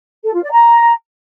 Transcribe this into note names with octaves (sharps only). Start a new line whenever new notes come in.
A4
F4
D5
A#5